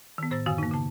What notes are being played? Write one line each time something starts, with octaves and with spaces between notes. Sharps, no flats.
D#3 B3
A2 C5 E6 A6
F#2 D3 D#3 F#4 F5 G#5
A#3 D#4
C#3 A5